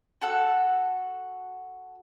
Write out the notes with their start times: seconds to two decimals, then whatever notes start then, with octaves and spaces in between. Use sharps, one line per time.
0.21 F#4 A4 F#5 E6